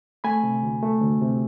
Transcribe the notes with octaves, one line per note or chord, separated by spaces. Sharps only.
A3 G#5 B5
C3
D2
A3
D2
C3